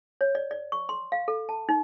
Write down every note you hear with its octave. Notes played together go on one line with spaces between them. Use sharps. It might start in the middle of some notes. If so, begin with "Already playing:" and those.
C#5
D5
D5
C#6
C6
F5
A4
A5
D#4